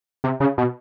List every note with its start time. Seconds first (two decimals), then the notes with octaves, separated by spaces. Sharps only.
0.24 C3
0.40 C#3
0.58 B2